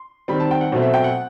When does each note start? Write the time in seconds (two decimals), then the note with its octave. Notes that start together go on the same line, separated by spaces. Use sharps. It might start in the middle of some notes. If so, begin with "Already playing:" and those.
Already playing: C6
0.28 D#3 G3 C4 B5
0.40 A5
0.51 G5
0.61 F#5
0.72 B2 F#3 A3 C4 C5
0.82 E5
0.94 G5
1.04 F#5